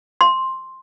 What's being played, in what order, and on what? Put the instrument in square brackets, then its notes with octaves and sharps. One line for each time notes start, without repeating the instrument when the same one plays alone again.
[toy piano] C6